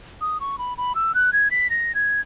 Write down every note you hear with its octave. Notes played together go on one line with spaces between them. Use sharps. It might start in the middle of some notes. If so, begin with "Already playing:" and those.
D#6
C#6
B5
B5
E6
F#6
G#6
B6
A#6
G#6